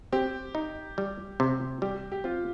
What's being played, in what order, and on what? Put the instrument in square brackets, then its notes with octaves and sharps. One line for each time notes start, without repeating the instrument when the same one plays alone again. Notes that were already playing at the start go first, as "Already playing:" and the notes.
[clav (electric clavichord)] C4 [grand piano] G4
[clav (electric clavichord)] D#4
G3
C3
[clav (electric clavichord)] G3 [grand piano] G4
[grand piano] G4
[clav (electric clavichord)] C4 [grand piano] F4